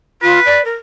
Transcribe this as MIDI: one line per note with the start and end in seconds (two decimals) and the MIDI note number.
0.22 0.40 65
0.22 0.60 71
0.46 0.64 74
0.65 0.75 70